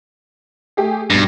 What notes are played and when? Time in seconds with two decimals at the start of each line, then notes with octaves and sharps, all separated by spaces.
0.77 A3 G4 G#4
1.10 B1 G2 A#6